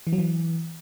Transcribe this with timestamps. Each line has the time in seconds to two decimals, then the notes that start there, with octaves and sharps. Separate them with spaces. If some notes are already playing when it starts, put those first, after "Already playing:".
0.07 E3
0.13 F#3
0.18 E3